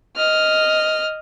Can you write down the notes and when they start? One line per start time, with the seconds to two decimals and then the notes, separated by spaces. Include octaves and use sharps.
0.17 D#5 F6